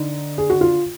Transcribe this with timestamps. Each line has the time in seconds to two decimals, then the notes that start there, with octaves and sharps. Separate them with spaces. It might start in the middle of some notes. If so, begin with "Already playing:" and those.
Already playing: D3 D#4
0.38 G#4
0.50 F#4
0.61 F4